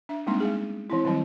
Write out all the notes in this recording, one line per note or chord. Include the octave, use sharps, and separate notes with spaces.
D4 E5
G3 G#3 A#3 C4 D4 D#4
G#3 B3 G#4
E3 C4 E4
D#3 F#3 G3 C4 E4